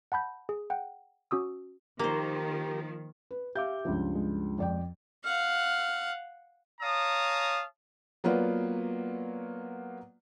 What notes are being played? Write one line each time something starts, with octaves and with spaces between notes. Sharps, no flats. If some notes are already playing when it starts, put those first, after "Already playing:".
F#5 A5 B5 G6
G#4
F#5 G5
C#4 F#4 D#6 E6
D#3 F3 A#3 G4 A#4 C5
B4
G4 E5 F5 D6 G6
C#2 G2 F3
G#3
F2 D5 G5
F5 F#5 F6
C#5 F5 A5 A#5 D#6
F#3 A#3 B3 F4 B4 D5